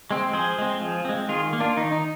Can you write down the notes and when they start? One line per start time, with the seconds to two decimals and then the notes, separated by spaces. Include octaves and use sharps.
0.11 G#3 C4
0.33 F3 G#4 C5
0.58 G#3 C4
0.81 F3
1.05 G#3 C4
1.29 D#3 F4 G#4
1.53 A#3
1.60 D4 F4
1.77 D#3 D#4
1.92 D#4